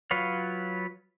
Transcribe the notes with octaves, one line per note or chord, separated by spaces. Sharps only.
F#3 F4 B4 C#5 F5